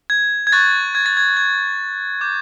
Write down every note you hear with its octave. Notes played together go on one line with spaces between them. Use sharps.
G#6
G#6
C#6 F#6 A6
G#6
A6
G#6
G#6
D6 G6